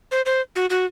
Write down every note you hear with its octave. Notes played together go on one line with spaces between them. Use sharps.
C5
C5
F#4
F#4